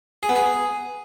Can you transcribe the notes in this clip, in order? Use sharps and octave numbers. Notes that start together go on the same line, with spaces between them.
G#4
B3
G#4